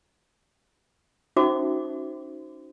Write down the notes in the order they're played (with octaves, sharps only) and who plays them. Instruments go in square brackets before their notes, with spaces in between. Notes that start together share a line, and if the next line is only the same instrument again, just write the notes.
[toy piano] C#4 D#4 F#4 C5 E5 D6